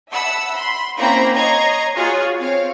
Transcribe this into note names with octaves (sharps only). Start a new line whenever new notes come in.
E5 F#5 A5 B5 E6
B5 C6
A#3 C4 C#4 E4 A#5 B5
C#5 D#5 A#5 G#6 C7
F4 F#4 G#4 C#5
C4 C#5 F5